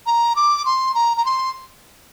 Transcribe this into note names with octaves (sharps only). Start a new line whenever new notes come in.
A#5
D6
C6
A#5
A#5
C6